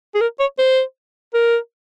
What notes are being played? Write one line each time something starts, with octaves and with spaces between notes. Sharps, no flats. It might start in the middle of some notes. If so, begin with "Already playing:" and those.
G#4
A#4
C#5
C5
A#4